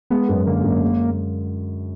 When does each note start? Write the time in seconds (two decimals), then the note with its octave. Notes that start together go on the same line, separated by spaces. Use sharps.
0.10 G#3 B3
0.29 F#2
0.46 D3 A#3
0.64 F#2
0.82 G#3